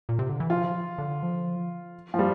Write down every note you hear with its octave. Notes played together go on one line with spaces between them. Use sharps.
A#2
C3
D3
E3
F3 F4
D3
F3
F3
G3